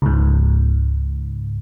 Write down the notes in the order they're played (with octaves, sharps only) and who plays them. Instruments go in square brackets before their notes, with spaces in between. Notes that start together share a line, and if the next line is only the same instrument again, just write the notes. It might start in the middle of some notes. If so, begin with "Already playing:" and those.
[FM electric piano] C#2 G#2